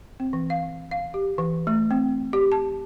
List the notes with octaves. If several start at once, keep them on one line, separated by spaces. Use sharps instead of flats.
C4
E3
F5
F5
G4
E3
A3
C4
G4
A5